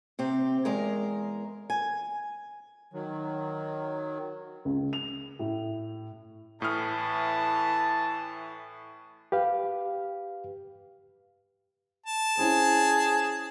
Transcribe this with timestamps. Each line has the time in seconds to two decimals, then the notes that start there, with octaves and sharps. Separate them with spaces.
0.19 C3 C4 G4
0.65 E2 G#3 A#4
1.70 G#5
2.92 D#3 F#3
4.65 C#2
4.93 F7
5.39 A2
6.62 A2 E3 A5 D#6 F6
9.32 G4 B4 F5
12.06 A5
12.38 C#4 E4 G#4 C5